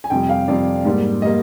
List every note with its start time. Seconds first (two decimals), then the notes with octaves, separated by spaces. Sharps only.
0.04 G#5
0.10 F2 C3 G3 G5
0.29 F5
0.48 F2 C3 G3 D5
0.85 G#2 G3 A#3
1.22 G3 A#3 D#5